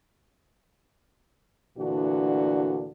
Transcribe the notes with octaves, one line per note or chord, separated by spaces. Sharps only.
D2 A#2 D3 E3 D4 F#4